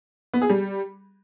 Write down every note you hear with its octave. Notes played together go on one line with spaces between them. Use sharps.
B3
G#4
G3